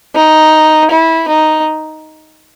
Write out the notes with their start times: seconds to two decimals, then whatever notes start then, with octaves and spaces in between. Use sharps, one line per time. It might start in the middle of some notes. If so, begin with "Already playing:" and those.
0.16 D#4
0.91 E4
1.29 D#4